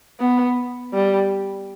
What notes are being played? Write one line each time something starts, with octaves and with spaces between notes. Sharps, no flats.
B3
G3